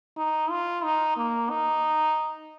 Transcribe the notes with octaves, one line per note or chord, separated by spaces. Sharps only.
D#4
F4
D#4
A#3
D#4